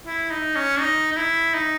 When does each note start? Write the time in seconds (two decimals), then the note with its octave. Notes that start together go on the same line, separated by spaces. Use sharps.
0.06 E4
0.31 D#4
0.56 C#4
0.80 D#4
1.12 D#4
1.17 E4
1.54 D#4